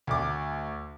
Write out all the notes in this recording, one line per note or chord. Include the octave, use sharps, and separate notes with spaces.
D2 D6